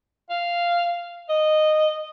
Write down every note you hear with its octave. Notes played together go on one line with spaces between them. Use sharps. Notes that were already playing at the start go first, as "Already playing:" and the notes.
F5
D#5